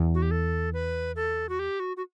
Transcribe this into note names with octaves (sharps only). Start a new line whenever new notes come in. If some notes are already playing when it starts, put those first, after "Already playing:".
Already playing: E2
F#4
G4
A4
B4
A4
F#4
G4
F#4
F#4